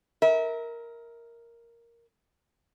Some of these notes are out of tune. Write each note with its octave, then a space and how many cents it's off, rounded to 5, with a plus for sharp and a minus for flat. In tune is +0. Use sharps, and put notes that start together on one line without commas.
A#4 +0 E5 -35